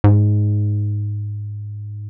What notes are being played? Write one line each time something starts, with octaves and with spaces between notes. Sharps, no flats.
G#2